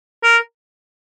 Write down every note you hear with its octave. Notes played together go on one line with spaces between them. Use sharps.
A#4